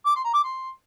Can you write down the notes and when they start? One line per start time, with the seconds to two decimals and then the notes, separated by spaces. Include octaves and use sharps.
0.06 D6
0.15 C6
0.24 A#5
0.34 D6
0.44 C6